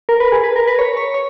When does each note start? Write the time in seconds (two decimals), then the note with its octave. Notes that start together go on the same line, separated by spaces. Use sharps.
0.09 A#4
0.20 B4
0.32 G#4
0.44 B4
0.56 A#4
0.67 B4
0.79 C#5
0.97 C#5
1.14 C#5